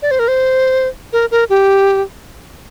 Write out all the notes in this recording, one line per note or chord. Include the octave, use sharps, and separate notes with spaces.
D5
C5
A#4
C5
A#4
A#4
G4